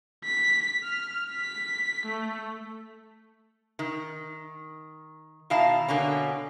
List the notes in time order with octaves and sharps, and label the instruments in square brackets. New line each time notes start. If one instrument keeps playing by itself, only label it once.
[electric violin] B6
F6
B6
A3
[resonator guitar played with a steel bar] D#3
B2 D#3 E4 F5 A5 A#5
B2 D3 A#3 C#4